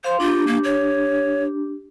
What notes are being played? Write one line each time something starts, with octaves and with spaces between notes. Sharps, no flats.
C5 F5 C6
D4 F4 G4
A#3
C#5